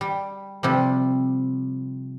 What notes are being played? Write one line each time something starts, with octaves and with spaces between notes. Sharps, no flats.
G3
C3 F3 G3